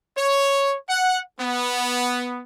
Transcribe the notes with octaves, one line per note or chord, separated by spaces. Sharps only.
C#5
F#5
B3